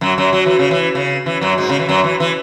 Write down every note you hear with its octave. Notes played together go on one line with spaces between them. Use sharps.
F#2 F#3
F#2 F#3
F#3
E3
C#3
E3
C#3
E3
F#2 F#3
G#2 G#3
C#3
E3
F#2 F#3
E3
E3